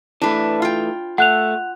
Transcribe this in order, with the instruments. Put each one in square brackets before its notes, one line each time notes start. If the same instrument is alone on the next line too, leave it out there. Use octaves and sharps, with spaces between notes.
[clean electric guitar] E3 A3 [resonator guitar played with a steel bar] D4 B4
[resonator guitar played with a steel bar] F4 G5
[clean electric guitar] A3 [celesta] F#5 F#6 F7